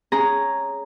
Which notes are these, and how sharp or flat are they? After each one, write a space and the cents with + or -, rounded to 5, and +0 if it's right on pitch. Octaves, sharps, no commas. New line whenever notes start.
C#4 +0 G#4 +0 A#5 +0